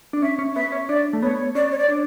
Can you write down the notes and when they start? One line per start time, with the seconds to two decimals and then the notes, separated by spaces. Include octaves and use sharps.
0.13 D4
0.22 C#4 E5
0.39 C#4
0.55 B3 E5
0.72 C#4
0.89 D4 D5
1.13 A3
1.22 B3 C#5
1.55 C#4 D5
1.71 C#5
1.78 D5
1.89 D4